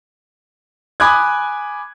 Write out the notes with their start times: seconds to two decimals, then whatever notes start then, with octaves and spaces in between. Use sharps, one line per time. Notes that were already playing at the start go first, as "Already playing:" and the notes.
1.00 G#5 B5 D6 D#6 F#6 G#6